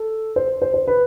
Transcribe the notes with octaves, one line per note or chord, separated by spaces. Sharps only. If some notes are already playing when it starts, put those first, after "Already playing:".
Already playing: A4
C5
C5
C5
B4